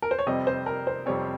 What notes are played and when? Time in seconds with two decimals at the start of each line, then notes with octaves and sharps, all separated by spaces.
0.02 A#4
0.11 C5
0.19 C#5
0.26 F2 C3 G3 C4 D#5
0.47 C5
0.66 A#4
0.87 C5
1.06 F2 C3 G3 C4 C#5